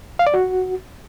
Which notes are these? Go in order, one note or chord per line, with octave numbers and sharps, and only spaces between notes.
F5
D5
F#4